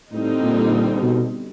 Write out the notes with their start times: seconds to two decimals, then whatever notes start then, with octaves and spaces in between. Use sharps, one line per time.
0.12 A2 D3 G3 C4 D#4
0.43 A#2
1.02 B2